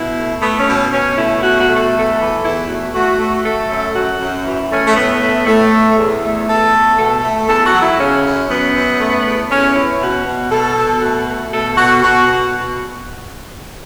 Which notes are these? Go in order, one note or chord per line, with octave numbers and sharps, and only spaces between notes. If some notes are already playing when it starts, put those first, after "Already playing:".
Already playing: B2 E4
A3
A3 B3
C#4
B2
C#4
B2 C#4
A3 E4
B2 F#4
F#4
A3
A4
E2 A4
E3
E2 E4
A3 F#4
A3 F#4
A3
A3 A4
F#2
F#2 F#4
F#2
E3
A3 C#4
A3
A2 B3
A3
A2 A3
A2
E2
A3
E2 A4
A3
B2 A4
A3
E2 A4
F#4
F#3
E4
C#3 C#4
F#2
F#2 B3
F#2
A3
E2
E2 C#4
E3 E4
B2 F#4
B2
B2 A4
B2
A3 F#4
A3
B2 A4
B2 F#4
B2 F#4
B2